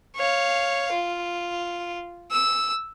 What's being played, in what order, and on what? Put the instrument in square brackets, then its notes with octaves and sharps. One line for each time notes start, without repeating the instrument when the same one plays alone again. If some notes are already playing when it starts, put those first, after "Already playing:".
[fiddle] C#5 F5
F4
E6